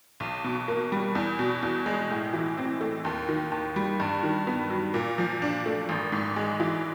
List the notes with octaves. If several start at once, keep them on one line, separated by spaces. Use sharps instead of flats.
B1
B2
A#3
G3
E2
B2
E2
G#3
A2
E3
C4
A3
D#2
D#3
D#2
G3
G2
D#3
B3
F#3
A#2
F3
D4
A3
G#1
G#2
G#3
E3